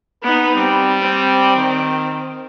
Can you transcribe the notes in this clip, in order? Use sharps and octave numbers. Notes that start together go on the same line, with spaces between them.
B3 D#4 B4
G3 C4
C4
D#3